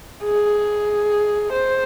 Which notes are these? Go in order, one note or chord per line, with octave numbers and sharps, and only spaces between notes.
G#4
C5